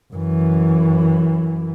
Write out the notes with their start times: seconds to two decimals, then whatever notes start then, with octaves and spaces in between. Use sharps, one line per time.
0.14 F#2 E3